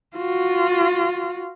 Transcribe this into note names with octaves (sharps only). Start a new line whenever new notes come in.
F4 F#4